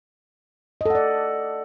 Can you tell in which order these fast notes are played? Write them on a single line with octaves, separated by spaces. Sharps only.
D#5 A4 F#5 D5